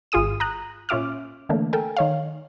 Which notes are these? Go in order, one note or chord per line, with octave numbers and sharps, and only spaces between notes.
G#1 F4 G#4 D#6 D#7
A#5 D#6 F#6
A#2 C#4 F4 E5 D6 F6
D3 E3 A3 A#3 D4
A4 A#4 G5 G#5
D#3 C#5 F5